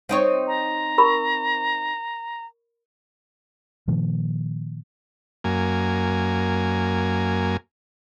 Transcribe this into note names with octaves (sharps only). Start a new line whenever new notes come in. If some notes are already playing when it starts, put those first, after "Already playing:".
C4 D#4 C#5
A#5
A#4 B5 C#6
A#2 D#3 F3 A#3
F#2 A#3 G#5